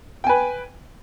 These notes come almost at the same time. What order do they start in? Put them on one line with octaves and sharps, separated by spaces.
G5 G#5 B4